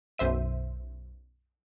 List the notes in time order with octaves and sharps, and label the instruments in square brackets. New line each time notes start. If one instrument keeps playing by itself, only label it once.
[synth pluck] B1 F#2 C5 E5 D#7